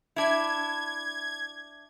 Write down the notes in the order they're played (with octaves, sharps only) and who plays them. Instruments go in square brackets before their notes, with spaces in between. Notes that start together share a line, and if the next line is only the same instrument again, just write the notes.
[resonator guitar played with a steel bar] D4 E4 [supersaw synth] G#6